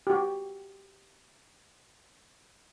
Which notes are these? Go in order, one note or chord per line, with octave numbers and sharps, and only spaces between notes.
F#4 G4